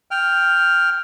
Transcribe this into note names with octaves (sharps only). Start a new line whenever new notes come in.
G5 F6